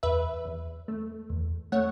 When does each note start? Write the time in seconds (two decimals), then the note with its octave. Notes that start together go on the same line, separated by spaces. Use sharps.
0.03 E2 B4 E5
0.45 E2
0.88 A3
1.30 E2
1.72 A3 C#5 F#5